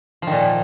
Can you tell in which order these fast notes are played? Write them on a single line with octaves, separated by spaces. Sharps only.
F3 D#3 A#2